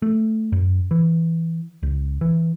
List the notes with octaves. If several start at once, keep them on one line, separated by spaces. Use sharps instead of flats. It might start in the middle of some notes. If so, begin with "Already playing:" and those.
A3
F#2
E3
C#2
E3